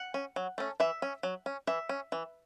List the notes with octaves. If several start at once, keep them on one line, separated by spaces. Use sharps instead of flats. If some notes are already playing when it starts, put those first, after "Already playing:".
Already playing: F#5
C#4
F#3
A3 C#4
E3 E5
C#4
F#3
C#4
E3 E5
C#4
E3